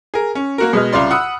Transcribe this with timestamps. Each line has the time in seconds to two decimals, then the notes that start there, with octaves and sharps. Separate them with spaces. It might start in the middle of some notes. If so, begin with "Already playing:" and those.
0.14 G#4 A#4
0.35 C#4
0.58 A#3 F#4 A#4
0.73 B2 G#3 D#5 F6
0.93 C2 C#3 F4 D5 C6
1.11 F#5 B5 D#6 E6 F#6